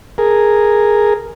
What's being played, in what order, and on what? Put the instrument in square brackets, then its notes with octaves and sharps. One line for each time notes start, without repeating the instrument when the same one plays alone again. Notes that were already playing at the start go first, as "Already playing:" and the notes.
[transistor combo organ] G#4 A#4